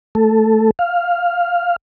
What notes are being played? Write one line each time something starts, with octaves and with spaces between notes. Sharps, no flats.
A3 A4
F5